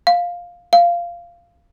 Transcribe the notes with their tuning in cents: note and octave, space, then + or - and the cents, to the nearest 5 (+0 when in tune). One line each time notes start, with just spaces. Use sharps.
F5 +5
F5 -15